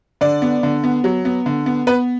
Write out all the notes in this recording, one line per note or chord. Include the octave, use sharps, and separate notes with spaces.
D3 D5
B3
D3
B3
F#3
B3
D3
B3
B3 B4